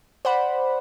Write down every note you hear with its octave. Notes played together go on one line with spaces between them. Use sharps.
C5 D5 F#5 B5